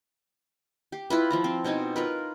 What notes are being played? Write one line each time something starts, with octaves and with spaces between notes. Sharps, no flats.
G4
E4 F4 B4
F3 E4 A#5
C4
B2 C4 D#4 G#5
F4 A#4 B4